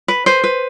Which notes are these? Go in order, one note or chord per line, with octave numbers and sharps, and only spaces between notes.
B4
B4 C5
B4